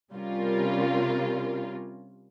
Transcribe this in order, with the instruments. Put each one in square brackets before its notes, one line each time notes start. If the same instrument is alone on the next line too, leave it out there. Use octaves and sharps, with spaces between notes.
[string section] C3 G3 C#4 F4 A#4